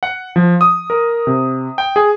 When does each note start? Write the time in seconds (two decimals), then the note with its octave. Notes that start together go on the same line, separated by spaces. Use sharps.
0.03 F#5
0.36 F3
0.61 D#6
0.90 A#4
1.27 C3
1.78 G5
1.96 G#4